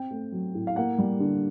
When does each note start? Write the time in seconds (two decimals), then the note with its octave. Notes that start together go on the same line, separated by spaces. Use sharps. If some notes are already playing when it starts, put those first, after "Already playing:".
Already playing: C4 G5
0.11 A3
0.32 F#3
0.54 A2
0.67 F5
0.76 A#3 F#5
0.98 G3
1.20 D3